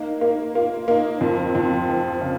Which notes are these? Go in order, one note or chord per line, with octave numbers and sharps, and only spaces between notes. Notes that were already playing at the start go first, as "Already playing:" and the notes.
Already playing: A#3 D#4
A#3
A#3 F4
A#3 D#4
F2 C4
F2
F3
C#3